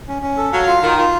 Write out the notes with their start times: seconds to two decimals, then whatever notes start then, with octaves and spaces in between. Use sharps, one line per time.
0.08 C#4
0.22 C#4
0.37 A4
0.53 F#3 F5
0.67 F4
0.82 D#3 F4
0.98 F4